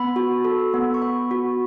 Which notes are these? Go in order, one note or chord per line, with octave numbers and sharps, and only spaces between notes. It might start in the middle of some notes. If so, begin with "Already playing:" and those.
Already playing: B3 B5
F#4
A4
B3
C#6
B3 B5
F#4